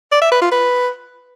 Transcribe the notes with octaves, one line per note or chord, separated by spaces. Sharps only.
D5
E5
B4
F4
B4